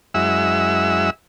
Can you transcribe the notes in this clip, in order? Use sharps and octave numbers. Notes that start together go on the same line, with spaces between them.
F#2 G#3 E4 E5 F#5 E6